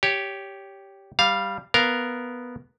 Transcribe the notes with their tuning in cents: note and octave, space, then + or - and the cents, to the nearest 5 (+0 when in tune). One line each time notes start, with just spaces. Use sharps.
G4 +0 C#5 +15
G3 +0 F5 +0
B3 +0 A#4 +0 F5 +0